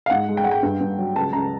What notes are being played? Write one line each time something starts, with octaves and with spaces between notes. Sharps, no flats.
F5
G#2 F#5
G#3
G5
G#3 F#5
G5
G2
G2
F#3
C#2 A5
C#2 A#5